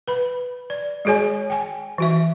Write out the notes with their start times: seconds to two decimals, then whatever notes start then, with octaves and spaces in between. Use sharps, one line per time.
0.08 B4 B5
0.70 D5
1.05 G#3 F#4 G#4 C#5 G#5
1.50 G5 G#5
1.98 E3 F#4 E5